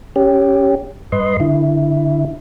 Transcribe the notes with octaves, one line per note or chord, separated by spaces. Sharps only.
C#4 G4
G2 B4 D#5 C6
D3 E4